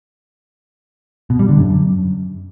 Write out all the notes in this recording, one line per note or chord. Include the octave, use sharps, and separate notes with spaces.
B2
G3
D3
F#2